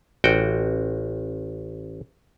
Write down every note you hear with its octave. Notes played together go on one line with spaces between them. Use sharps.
A1 F#4 G5